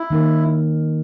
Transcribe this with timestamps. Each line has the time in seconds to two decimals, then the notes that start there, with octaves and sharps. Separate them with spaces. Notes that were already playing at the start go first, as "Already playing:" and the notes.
Already playing: E4
0.10 D#3 A#3 D#4 A#4